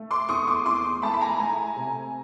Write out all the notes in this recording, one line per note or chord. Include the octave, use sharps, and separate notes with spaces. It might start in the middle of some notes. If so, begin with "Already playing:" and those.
Already playing: A3
C6 D6
E2 C#6 D#6
C6 D6
E2 C6 D6
A3 A5 B5
B5
G#5 A#5
A3 G#5 A#5
C3